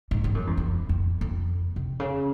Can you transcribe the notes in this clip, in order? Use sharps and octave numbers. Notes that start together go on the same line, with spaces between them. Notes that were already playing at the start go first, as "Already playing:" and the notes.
G#2
G2
F#2
E2
F2
F2
F2
C3
C#3